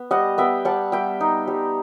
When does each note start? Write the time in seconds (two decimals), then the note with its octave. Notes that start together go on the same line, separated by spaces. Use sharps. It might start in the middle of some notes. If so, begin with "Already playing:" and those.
Already playing: B3
0.11 G3 D#5 F#5
0.38 B3 E5 G5
0.65 G3 F#5 A5
0.92 G3 E5 G5
1.21 D#4
1.47 G3